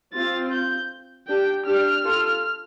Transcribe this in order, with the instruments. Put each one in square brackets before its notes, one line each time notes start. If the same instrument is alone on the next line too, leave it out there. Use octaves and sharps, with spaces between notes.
[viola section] C4 F4 [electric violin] A6
[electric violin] G6
[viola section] D4 G4 [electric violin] G5
[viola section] D4 G4 [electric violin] F6
[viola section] F4 A4